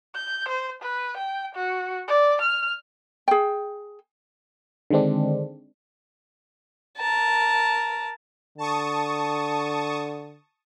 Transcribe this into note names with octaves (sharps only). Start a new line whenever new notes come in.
G6
C5
B4
G5
F#4
D5
F6
G#4 G5
D3 D#3 G#3 C4 D4
A#4 A5
D3 A5 C#6 D#6